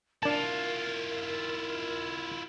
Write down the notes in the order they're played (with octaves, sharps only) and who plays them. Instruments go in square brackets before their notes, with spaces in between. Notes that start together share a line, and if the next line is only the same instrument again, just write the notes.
[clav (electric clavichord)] D4 A5 [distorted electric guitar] E4 F4 [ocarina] A#4